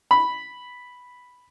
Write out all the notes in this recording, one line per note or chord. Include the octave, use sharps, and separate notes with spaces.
B5